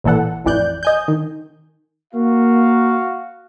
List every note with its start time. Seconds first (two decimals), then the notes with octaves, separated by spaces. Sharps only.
0.04 A1 A#2 E3 A4 F#5
0.45 A1 F2 E3 D5 F#6 G6
0.83 D#5 G#5 G6
1.08 D#3
2.14 A#3 F#4 F5